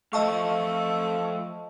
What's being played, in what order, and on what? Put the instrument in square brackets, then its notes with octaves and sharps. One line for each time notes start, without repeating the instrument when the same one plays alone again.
[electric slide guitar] F3 A4 F5 [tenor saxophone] A3 [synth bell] D#5 A5 C#6